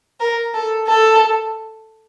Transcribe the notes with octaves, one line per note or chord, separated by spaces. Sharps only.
A#4
A4
A4